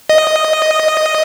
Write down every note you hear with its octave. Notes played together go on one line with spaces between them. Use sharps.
D#5